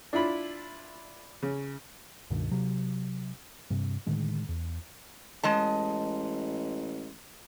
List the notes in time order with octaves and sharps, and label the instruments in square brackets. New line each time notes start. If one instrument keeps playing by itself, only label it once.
[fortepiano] D4 E4 F4 B5
C#3
[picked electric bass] C#2 G2 B2 D#3
C3 F#3
G2 C3
A2 D3 D#3 G#3
E2
[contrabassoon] A1 [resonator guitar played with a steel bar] G#3 D#5 A5